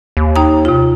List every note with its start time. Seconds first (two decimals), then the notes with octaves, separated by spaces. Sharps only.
0.17 D#2
0.36 D#4 G5 A#5
0.65 C3 F4